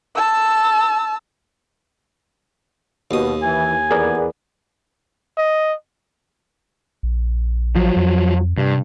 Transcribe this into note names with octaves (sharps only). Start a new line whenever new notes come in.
A5 E6
D#2 B2 D#6
E3 G#5
E2 B3 G#4 A#4 D5
D#5
A#1
F3 F#3
F2
G2 C3